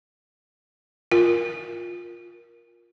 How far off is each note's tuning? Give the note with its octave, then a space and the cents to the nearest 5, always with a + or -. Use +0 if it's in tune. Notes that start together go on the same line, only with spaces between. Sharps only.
F4 +10 A#4 +10